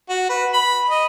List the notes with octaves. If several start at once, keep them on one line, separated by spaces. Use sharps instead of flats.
F#4
B4
B5
D#5